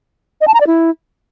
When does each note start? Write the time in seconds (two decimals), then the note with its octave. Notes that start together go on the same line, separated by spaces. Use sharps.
0.41 D#5
0.48 A5
0.54 A#5
0.61 D5
0.67 E4